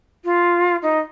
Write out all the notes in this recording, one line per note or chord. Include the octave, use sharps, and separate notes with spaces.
F4
D#4